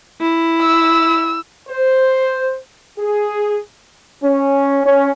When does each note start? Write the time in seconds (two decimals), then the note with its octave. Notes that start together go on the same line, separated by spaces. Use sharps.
0.21 E4
0.62 E6
1.68 C5
2.98 G#4
4.22 C#4
4.84 C#4